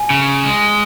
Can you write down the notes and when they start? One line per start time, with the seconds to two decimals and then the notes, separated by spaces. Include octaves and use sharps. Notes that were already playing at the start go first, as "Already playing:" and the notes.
Already playing: G#5
0.10 C#3
0.45 G#3